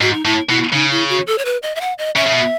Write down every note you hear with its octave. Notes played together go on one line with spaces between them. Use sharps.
G#2 F#4
D#4
A2 E4
B2 E4
C#3 D#4
E4
F#4
A4
C#5
B4
D#5
E5
F#5
D#5
C#3 E5
C#3
B2